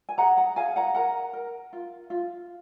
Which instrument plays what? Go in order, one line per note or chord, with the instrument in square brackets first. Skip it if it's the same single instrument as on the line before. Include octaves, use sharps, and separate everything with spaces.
[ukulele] G#5
G#4 F#5 A#5
F#5 A#5
G#4 F5 G#5
F#5 A#5
A#4 F#5 A#5
A#4
F4
F4